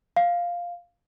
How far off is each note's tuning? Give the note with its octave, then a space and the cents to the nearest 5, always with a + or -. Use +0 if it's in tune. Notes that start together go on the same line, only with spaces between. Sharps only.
F5 +0